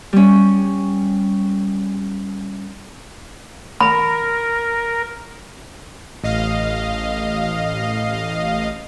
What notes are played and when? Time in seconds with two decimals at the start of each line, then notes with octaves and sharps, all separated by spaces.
0.13 G3 C#4
3.81 A#4 B5
6.24 A1 D#5 F5